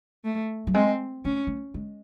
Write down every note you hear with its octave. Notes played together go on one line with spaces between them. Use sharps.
A3
F#3
G#3 C4
A3 C#4
A3
G#3